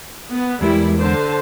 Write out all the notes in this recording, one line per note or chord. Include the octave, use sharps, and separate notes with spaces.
B3
E2 G3 G#3 E4 A#4
D3 C5 A5